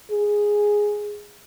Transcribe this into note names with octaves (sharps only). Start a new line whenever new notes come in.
G#4